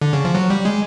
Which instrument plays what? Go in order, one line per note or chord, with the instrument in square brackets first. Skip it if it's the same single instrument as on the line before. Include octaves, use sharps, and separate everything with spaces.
[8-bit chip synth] D3
C#3
F3
F#3
G3
G#3